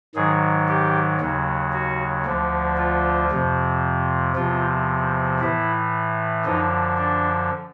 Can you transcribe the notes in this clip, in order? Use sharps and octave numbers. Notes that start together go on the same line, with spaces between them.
G#2 D#3 F#3 G#4
G4
D#2 C#3 F#3
F#4
D2 D3 F3
F4
F2 C3 F3
E2 C3 F3 F4
A2 E3 E4
F#2 D3 F3 D#4
D4